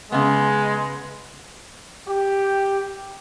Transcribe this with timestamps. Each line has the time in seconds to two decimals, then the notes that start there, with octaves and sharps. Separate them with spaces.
0.12 C#3 G#3 B3
2.07 G4